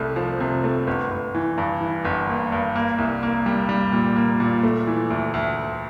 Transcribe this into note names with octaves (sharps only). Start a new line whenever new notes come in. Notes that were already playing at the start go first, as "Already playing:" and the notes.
Already playing: C2 C3 A3
F3
C3
A3
G1
G1
E3
G2
E3
G1
A#3
G2
A#3
C2
A#3
G3
G3
A#2
A#3
A#2
A3
E3
D2
D2
D2